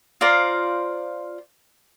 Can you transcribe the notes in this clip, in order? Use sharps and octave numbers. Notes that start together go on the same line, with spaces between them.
F4 C5 D5 A#5